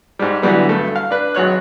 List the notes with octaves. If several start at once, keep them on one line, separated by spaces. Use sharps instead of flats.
G#2 G3
D3 E3 F#3 G3 B3
G2 A3
F5
D4 B4
G#1 F#3 C#5 F#6